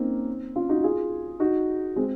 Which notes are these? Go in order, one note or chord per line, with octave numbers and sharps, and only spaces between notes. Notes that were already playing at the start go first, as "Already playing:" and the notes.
Already playing: A#3 C4 C#4 D#4
C#4 F4
D#4 F#4
F4 G#4
D#4 F#4
G#3 C4